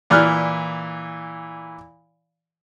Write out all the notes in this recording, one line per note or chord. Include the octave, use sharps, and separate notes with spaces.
A#2 E3 D5 F6 F#6